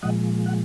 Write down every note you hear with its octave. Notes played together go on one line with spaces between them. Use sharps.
A#2 F3 G#3 D#5 F#5
F#5